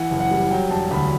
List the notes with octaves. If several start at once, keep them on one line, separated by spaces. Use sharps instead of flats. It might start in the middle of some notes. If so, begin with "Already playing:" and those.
Already playing: E3 F#5
F#1
F#5
G3
F#3 G5
E1 A5
D2 B5